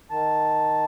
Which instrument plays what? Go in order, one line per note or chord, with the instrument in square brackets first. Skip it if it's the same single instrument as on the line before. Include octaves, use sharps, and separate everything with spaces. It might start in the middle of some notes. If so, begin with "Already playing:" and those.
[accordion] D#3 A5